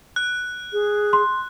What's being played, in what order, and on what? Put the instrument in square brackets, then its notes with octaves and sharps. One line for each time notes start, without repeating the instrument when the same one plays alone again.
[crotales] F#6
[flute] G#4
[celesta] C6